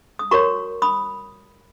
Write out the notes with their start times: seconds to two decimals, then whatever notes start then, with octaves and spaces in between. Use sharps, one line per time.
0.19 D#6
0.31 F#4 A#4 C#5 A#5 C#6
0.82 B5 D#6